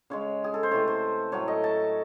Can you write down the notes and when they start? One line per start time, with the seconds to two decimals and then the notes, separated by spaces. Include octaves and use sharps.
0.10 C#3 G#3 C#5
0.44 G#4
0.54 A4
0.63 C5
0.71 C3 E3 A3 C#5
0.88 C5
1.32 A2 F#3 A3 C#5
1.48 D#5
1.64 A5